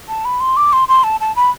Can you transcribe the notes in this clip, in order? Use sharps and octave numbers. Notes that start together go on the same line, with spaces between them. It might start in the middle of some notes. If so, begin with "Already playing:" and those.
A5
B5
C6
D6
C6
C6
A5
A5
B5